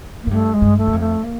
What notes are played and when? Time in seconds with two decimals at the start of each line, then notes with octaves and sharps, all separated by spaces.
0.23 A#3
0.27 G#2
0.31 G2 A3
0.54 G#3
0.62 G2
0.77 A3
0.87 F#2
0.93 F2
1.00 A3
1.24 A#3